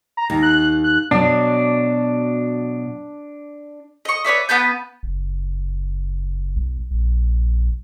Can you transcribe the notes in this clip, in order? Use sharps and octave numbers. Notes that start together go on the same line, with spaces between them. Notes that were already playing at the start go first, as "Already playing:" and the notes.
A#5
D#2
F#6
F#6
B2 F#3 D4
D#5 C#6
B4 C#5 D5 E5
B3 B4 A5 G6
F#1
B1
A#1